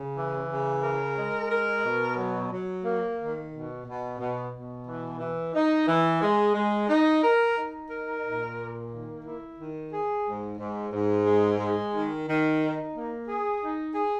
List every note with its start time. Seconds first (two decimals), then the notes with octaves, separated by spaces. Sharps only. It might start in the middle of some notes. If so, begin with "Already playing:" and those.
Already playing: C#3
0.15 E3
0.49 C#3
0.83 A#4
1.16 G#3
1.51 A#4
1.84 B2
2.17 F#3
2.52 F#3
2.85 A#3
3.19 D#3
3.52 B2
3.86 B2
4.19 B2
4.53 B2
4.87 E3
5.20 E3
5.54 D#4
5.87 E3
6.22 G#3
6.55 G#3
6.88 D#4
7.22 A#4
7.56 D#4
7.90 A#4
8.23 A#2
8.57 A#3
8.91 D#3
9.25 E4
9.57 D#3
9.92 G#4
10.25 G#2
10.58 G#2
10.92 G#2
11.25 G#3
11.59 G#3
11.93 D#3
12.27 D#3
12.60 D#4
12.94 A#3
13.28 G#4
13.62 D#4
13.95 G#4